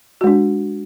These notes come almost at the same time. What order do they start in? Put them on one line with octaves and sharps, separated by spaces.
F#4 G#3 D4